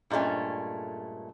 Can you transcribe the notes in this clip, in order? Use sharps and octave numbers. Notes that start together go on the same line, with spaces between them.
G2 A#2 G#3 A3 C#4